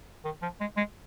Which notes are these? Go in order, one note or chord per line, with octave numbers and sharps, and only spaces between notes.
D#3
F3
G#3
G#3